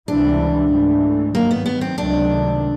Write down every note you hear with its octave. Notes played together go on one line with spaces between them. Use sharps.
C#2 C3 E3 G3 D4
G#2 E3 A3
G2 D#3 F#3 A#3
B3
B3
C4
C#2 C3 D#3 F#3 A3 D4